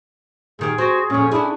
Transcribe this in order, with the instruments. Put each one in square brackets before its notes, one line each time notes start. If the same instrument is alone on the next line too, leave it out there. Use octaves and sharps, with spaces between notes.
[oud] A#2 D#3 G4 [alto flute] G#4
[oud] C4 [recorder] F#4
[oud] F2 A#2 [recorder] C#4
[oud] C#4 G#4 [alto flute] D4 [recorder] E4